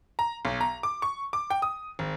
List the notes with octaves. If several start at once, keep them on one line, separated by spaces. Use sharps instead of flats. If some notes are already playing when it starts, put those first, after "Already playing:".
A#5
B1
A#5
D6
C#6
D6
G5
D#6
G#1